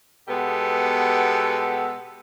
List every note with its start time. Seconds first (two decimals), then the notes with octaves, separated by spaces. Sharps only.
0.28 B2 G#3 B3 G4 A4 F#5